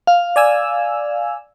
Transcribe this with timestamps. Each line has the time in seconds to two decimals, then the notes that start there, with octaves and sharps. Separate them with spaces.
0.07 F5
0.36 D5 G#5 E6